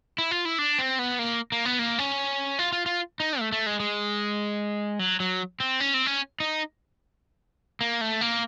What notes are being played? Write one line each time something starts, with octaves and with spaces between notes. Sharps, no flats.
E4
F4
E4
D4
C4
B3
A#3
A#3
B3
A#3
C#4
F4
F4
F4
D#4
A3
A3
G#3
G#3
F#3
F#3
C4
C#4
C4
C#4
D#4
A#3
A3
A#3